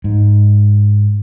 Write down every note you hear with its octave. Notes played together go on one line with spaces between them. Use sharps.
G#2